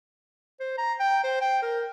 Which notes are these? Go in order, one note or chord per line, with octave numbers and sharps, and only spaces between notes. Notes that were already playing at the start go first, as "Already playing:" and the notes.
C5
A#5
G5
C5
G5
A#4